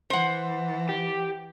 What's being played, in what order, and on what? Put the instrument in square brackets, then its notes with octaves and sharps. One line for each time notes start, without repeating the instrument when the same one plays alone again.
[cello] E3 [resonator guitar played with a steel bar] C5 F#5
[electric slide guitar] G4